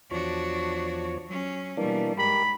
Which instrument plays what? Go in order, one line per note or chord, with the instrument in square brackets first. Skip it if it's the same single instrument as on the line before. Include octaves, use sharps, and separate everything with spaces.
[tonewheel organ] E2 F3 C#5 [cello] D4 F#4
[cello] F#3 C#4
[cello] B2 G3 [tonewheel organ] E3 A#3 D4
[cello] G#2 [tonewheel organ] G4 A#4 [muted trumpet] B5